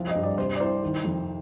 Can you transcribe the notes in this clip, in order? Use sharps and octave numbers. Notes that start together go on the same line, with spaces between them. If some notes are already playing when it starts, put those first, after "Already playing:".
Already playing: C2 F3
D#5
G2
D5
C3 C5
D5
C2 C5
D#3
F2